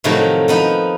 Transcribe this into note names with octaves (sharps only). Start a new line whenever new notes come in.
A2 C3 D#3 F3 F#3
F3 B3 D#4